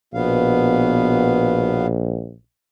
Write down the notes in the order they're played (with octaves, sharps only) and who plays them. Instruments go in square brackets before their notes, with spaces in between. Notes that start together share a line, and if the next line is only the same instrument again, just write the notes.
[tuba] A#1 [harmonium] B2 B3 F5